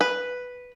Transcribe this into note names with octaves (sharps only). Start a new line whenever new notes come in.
B4